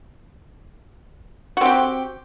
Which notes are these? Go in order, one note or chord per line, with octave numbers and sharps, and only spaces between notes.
C4 F#4 G4